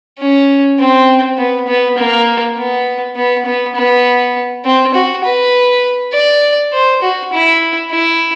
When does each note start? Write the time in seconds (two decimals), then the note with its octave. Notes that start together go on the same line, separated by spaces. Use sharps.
0.19 C#4
0.79 C4
1.38 B3
1.67 B3
1.98 A#3
2.58 B3
3.16 B3
3.46 B3
3.76 B3
4.65 C4
4.94 F#4
5.24 B4
6.13 D5
6.73 C5
7.02 F#4
7.33 E4
7.91 E4